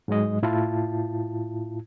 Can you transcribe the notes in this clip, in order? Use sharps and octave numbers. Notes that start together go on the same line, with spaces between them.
G#2 F#3 G#3 D#5
A2 E4 F4 A5